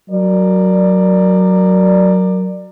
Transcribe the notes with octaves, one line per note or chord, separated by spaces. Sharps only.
F#3 A#4 D5